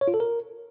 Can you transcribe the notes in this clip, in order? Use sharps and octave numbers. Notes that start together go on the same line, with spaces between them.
C#5
F4
A4
A#4